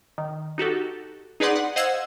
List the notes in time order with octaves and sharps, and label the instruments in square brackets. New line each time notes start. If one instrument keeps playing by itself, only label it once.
[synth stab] D#3
D#4 F#4 G4 A4
D#4 G#4 B4 D5 F#5 C6
F#5
C5 D#5 F5 F#5 E6 G#6